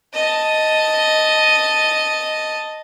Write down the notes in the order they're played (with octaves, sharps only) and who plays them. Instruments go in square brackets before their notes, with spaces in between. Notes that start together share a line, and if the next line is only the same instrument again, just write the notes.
[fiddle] D#5 A5